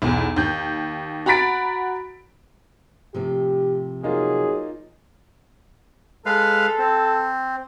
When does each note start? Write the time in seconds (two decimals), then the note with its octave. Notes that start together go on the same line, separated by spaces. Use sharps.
0.02 B1 E2
0.36 D#2 G6
1.26 F#4 A#5 B5 A6 B6 D7
3.14 A2 C3 F3 G4
4.03 F#3 A#3 D#4 F4 G#4
6.26 G#3 A4 B4 F5
6.79 C4